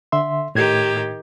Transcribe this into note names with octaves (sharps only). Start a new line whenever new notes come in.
D3 E5 C6
A2 D#3 G4 G#6